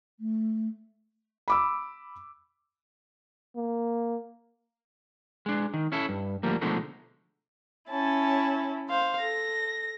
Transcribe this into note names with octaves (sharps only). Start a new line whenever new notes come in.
A3
B5 D6 E6
A#3
G#3 D4
D#3
C#4 E4 A4
G2
D2 F3 G3 A#3
B2 D3 F3 G#3 A3 D#4
C#4 E4 A5
C5 F5
A4 A#6